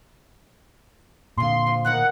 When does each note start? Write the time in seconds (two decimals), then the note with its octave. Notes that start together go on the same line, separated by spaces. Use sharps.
1.38 A#2 D3 F4 G#4 C6
1.67 F3
1.85 A2 D#3 A#4 F#5